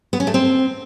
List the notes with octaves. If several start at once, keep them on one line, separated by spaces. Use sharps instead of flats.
B3
C#4
A3
C4